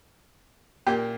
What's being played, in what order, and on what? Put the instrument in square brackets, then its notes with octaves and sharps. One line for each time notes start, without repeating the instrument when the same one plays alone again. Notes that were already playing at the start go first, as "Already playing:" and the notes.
[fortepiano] A#2 A#3 G4